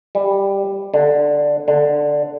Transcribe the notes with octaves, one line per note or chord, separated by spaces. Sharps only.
G3
D3
D3